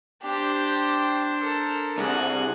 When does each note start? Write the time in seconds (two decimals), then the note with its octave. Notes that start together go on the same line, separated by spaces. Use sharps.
0.23 D4 G4 C5
1.39 A4 A#4
1.98 C2 G#4 F#5 G#5